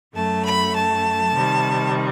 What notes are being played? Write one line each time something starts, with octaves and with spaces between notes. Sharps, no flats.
F#2 F#3 A3 A5
B5
A5
C3 D#3 G3